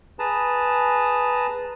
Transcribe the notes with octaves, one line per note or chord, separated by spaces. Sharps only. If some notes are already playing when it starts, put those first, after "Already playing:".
G#4 B4 A5 A#5